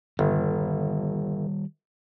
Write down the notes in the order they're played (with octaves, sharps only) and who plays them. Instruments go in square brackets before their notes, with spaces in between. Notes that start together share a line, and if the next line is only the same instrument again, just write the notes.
[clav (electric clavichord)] G1 [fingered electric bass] D#3 G3